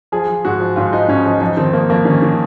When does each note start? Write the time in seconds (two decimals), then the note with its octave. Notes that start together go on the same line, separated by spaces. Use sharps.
0.12 F3 G#4
0.28 F3
0.45 G#2 F#4
0.60 F3
0.76 G#2 F4
0.92 F3 D#4
1.08 G#2 C#4
1.25 F3 D#4
1.41 F2 D#4
1.57 D#3 C4
1.73 F2 A#3
1.90 F2 A#3
2.05 D#3 C#4
2.22 D#3